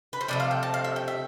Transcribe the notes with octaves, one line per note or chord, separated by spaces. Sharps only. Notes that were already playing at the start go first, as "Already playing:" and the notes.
B4
C5
C3 F3 A3 D5
F5
G5
A5
F5
E5
G5
E5